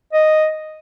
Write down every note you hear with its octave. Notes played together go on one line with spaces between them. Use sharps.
D#5